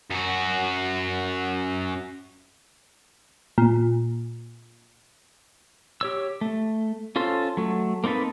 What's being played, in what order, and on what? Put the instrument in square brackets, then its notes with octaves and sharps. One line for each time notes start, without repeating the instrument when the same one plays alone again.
[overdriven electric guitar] F#2 F#4
[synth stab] A#2
[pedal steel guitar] G4 C#5 E6
A3
C#4 F4 A4 C5
F#3 A3
A#3 C4 D#4 A4 B4